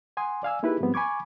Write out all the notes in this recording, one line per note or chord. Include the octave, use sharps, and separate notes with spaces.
F#5 G#5 C6 D#6
D5 F5 G#5 E6
A#3 D#4 E4 G4 G#4 B4
G#2 F3 G3 B3 C4
G#5 B5 C#6 D6 G#6